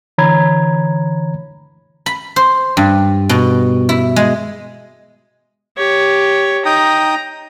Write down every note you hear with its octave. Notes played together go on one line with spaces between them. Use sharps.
D3 E3 C#5 A#5 B5 G#6
B5
C5
G2
B2
E4
G#3
G4 C#5
D#4 G5 A#5 D#6